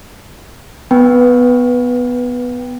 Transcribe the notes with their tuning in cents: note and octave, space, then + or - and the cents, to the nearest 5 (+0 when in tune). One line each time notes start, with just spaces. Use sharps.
B3 +5 B4 -10 G5 +0